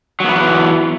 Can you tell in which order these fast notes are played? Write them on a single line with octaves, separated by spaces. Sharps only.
F#3 B3 E3